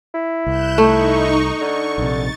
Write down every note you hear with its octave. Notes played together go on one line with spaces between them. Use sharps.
E4
C2 F#6 G6 E7
A3 D#4 C#6
D3 C#6
A#1 C3 A6